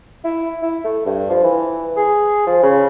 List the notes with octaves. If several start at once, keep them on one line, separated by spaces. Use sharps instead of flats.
E4
E4
A3
G2
F3
E3
G#4
F3
C#3